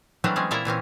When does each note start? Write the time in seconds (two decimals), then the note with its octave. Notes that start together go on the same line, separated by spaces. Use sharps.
0.24 E3 F#3 G3 A3 C4 D4
0.36 G#3 C4 C#4
0.51 A#2 A#3 E4 D5 E5 A#5
0.65 A#2 E3 C4 C#4